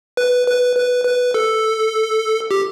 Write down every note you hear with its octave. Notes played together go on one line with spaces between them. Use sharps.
B4
B4
B4
B4
A4
G4